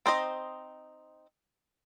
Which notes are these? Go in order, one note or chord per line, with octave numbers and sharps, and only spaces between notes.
C4 D#4 C5 D#5